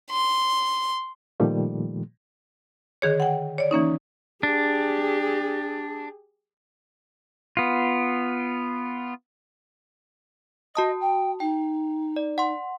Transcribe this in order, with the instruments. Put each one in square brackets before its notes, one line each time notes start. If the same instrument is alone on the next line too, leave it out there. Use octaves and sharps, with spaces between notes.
[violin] C6
[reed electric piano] A#2 D#3 F3 G3 A3
[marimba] D3 D#3 G#4 C#5
F#5 G5
C#5 D5
E3 A#3 C#4 D#4
[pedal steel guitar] D4 [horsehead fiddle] G4 G#4
[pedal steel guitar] B3 F4
[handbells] F#4 A5 D#6 [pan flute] D#5
[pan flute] G5
[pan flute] D#4 [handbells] G5
[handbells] D5
F#5 C6